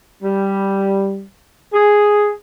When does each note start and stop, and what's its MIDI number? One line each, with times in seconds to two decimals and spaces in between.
0.23 1.25 55
1.73 2.31 68